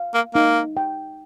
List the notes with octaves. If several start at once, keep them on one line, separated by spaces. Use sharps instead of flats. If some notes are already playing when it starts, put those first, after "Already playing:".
Already playing: F5
A#3
A#3 D#4
G5